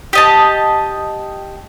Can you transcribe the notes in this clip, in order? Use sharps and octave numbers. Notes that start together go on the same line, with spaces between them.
G4 D#5 A5